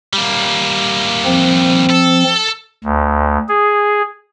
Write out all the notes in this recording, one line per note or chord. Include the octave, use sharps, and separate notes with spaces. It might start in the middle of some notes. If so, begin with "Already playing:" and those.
G3 A#3
F3 C4
A4
D2
G#4